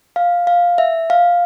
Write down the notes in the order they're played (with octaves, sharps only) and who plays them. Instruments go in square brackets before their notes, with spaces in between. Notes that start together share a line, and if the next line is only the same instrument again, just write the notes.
[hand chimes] F5
F5
E5
F5